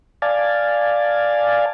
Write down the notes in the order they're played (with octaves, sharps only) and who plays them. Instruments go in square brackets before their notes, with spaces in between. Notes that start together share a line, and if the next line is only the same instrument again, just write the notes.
[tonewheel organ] D5 F5 G#5 A5